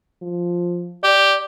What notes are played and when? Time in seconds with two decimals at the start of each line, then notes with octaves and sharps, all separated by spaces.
0.22 F3
1.03 G4 D5